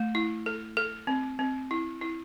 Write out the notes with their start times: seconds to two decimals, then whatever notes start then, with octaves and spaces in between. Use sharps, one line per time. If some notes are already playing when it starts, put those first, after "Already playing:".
Already playing: A3
0.15 E4
0.46 A4
0.77 A4
1.07 C4
1.39 C4
1.71 E4
2.01 E4